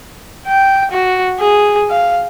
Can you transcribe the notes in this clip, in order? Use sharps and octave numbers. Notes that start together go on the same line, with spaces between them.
G5
F#4
G#4
F5